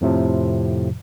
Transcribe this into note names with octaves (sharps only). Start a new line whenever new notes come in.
F2 A2 C3 F3